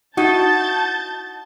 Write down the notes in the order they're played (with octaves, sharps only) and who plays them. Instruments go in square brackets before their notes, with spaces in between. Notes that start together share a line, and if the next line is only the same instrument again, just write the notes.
[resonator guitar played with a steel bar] D#4 E4 [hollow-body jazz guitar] F#4 [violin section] A5 G6 A6